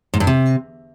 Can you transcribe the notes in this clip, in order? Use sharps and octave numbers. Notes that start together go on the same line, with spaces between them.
G#2
G2
C3